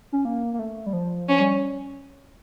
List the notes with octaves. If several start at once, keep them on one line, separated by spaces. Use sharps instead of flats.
C#4
A#3
A#3
A3
G3
F3
F3 C#4
G3